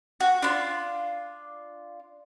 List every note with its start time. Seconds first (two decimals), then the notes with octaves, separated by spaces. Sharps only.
0.20 F#4
0.42 D4 E4 F4